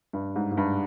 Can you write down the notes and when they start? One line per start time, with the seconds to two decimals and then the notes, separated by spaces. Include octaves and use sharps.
0.13 G2
0.36 G#2
0.51 G#2
0.57 G2